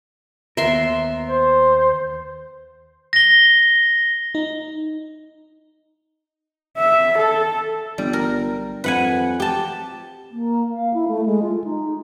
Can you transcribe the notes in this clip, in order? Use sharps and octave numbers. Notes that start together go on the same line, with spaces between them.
D#2 B3 A#4 E5 C6
C5
A#6 G7
D#4
E5
A4
G1 G3
A#4
F2 B4 F#5 G#5
G4 A5
A#3
F5
E4
A3
G#3
F4
D#4